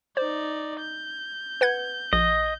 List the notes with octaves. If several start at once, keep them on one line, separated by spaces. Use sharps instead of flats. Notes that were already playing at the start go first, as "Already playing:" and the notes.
D#4 C5 D5
G6
B4 F#5 G#6
A#1 D#5